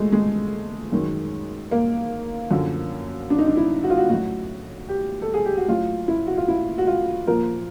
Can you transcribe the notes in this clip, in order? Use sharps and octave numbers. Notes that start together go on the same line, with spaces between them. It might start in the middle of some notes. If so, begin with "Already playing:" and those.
Already playing: A#2 G#3 A3
G#3
F#2 D#3 F#3
A#3
F#2 D3 F3
D4
D#4
D4
E4
F#4
F4
F#4
A2 F#3 F#4
G4
A4
G#4
G4
F#4
A2 F#3 F4
E4
F#4
F4
E4
F#4
F4
A#2 F3 A#4